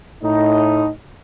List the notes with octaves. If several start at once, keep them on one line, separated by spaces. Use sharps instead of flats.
A2 D#4